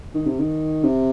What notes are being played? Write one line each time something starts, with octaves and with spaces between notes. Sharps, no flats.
D#3
C3
D#3
C3